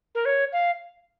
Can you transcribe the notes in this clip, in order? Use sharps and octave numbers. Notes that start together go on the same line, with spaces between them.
A#4
C#5
F5